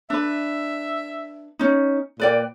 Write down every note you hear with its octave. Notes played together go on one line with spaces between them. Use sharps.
D4 B4 E5
C#4 D#4
A#2 B4 D5 G5